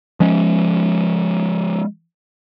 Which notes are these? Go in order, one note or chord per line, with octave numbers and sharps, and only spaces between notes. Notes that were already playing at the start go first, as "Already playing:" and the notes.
F3 G#3 C#4